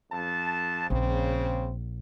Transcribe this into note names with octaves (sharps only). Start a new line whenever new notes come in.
F2 A5
A#1 C#3 C4